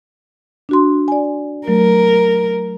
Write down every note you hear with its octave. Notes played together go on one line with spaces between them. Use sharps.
D4 F#4 C6
D5 G#5
F#3 A3 A#4